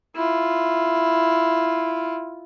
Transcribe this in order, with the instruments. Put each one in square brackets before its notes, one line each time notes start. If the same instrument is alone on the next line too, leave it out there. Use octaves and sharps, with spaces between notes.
[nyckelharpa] E4 F4